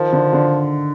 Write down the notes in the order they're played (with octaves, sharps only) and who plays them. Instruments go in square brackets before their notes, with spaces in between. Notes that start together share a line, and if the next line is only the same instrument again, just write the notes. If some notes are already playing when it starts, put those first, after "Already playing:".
Already playing: [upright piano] D#3 [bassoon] F3
[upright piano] D3
D3